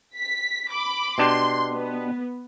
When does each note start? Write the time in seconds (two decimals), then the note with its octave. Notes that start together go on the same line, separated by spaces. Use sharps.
0.16 B6
0.70 B5 D6
1.18 B2 D4 G4 C6
1.72 B3